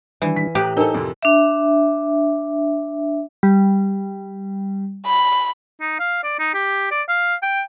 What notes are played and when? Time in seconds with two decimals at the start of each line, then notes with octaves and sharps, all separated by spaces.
0.22 D#3 E3 G3 D4 D5
0.36 B6
0.55 A2 G4 A#5 D#6 F#6
0.77 D4 D#4 A4 A#4 C5
0.94 F2 C3 D5 D6
1.23 D4 E5
3.43 G3
5.07 B5
5.81 D#4
6.00 F5
6.23 D5
6.39 D#4
6.54 G4
6.91 D5
7.09 F5
7.42 G5